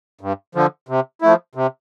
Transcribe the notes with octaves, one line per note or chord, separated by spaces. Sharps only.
G2
D3 F3
C3
F3 A3 E4
C3